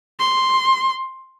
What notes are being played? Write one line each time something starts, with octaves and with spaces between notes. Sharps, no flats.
C6